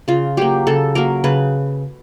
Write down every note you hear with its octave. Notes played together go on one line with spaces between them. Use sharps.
C#3 F4
F#3 A#3 G4
C#3 A4
F#3 A#3 A#4
C#3 B4